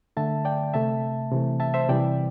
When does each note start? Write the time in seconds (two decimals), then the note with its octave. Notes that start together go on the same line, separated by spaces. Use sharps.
0.17 D3 A3 E5 A5
0.45 D5 G5
0.74 C3 A3 E5 A5
1.32 C3 E3 A3
1.60 E5 A5
1.74 C5 E5
1.89 C3 E3 G3 D5 G5